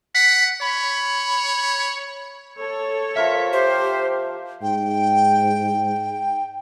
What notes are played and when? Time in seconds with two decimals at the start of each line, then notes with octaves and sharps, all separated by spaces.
0.15 F#5 B6
0.61 C#5 B5
2.58 A4 C#5
3.17 F3 A#4 E5 F5
3.53 G4 C5
4.62 G#2 G5